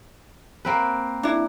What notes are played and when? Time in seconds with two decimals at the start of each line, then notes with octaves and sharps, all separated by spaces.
0.65 A#3 C4 B4
1.23 D4 E4